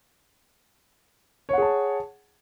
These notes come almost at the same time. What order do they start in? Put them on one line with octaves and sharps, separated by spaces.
C#5 F#5 G#4 A5